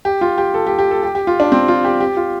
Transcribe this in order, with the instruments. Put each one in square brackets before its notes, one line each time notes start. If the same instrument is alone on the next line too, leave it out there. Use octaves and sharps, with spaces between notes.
[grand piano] G4
F4
G4
A4
G4
G4
A4
G4
G4
F4
D4
C4
F4
G4
G4
F4